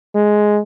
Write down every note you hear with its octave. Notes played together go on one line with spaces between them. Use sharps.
G#3